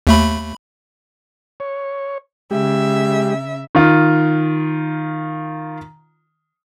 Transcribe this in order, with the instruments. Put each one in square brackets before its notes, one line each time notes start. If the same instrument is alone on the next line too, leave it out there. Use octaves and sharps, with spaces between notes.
[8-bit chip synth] D#2 A3 B5
[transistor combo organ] C#5
[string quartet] C#3 E5 [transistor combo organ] G#3 G4
[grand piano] D#3 F4